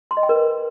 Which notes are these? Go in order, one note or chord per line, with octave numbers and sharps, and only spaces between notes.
C6
D#5
G5
A#4
B4